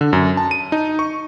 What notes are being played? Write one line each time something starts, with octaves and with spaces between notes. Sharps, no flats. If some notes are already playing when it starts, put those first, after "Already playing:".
D3
F#2
A5
D#7
D#4
C#6